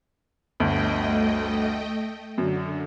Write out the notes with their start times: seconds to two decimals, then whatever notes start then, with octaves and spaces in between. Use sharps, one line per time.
0.60 G1 D2 A3 D#5 G5
2.38 F#2 D3